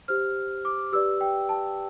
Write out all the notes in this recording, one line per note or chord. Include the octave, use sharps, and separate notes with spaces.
G4 C5 F6
D6
G4 B4 D5 E6
G5
A5